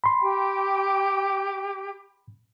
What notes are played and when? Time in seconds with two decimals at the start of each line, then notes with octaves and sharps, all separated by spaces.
0.04 B5 C6
0.22 G4 G5